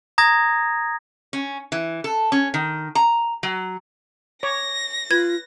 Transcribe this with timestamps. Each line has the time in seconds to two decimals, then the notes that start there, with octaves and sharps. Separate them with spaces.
0.18 A#5 D#6 G#6 A#6
1.33 C#4
1.72 E3
2.04 A4
2.32 C#4
2.54 D#3
2.95 A#5
3.43 F#3
4.43 C#5 D6 A#6
5.11 F4 B4 G#6